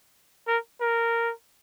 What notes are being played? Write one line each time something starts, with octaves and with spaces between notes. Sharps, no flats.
A#4
A#4